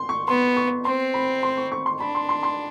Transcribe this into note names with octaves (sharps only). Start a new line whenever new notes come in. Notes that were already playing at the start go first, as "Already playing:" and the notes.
Already playing: C6
C#6
B3 C6
C#6
C4 C6
B5
C6
C#6
C#6
C6
D4 B5
C6
C6
C6